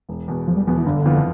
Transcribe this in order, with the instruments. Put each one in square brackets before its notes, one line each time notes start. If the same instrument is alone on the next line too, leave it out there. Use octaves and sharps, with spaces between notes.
[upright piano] E1
E2 B2 B3
[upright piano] E1 [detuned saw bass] F3
[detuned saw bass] G3
[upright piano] E2 B2 B3 [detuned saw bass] F3
[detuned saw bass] E3
[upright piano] G1 [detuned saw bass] D3
[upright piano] F2 E3 B3 F4